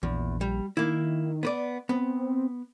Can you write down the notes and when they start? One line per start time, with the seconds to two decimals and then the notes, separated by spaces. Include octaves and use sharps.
0.03 A#1 E2
0.41 G3
0.77 D#3 A#3 E4
1.43 B3 B4 D5
1.89 B3 C4